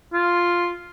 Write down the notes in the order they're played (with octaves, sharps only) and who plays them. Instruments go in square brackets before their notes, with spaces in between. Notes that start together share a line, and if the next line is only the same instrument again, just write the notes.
[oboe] F4